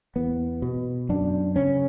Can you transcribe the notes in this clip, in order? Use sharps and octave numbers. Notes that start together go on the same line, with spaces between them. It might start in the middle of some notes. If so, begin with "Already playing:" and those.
E2 B3
B2
F#2 D4
C#3 C#4